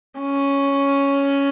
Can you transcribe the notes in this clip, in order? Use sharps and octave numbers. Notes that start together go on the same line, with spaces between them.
C#4